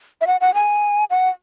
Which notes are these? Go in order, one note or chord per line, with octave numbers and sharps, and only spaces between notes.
E5
F#5
F#5
G#5
F#5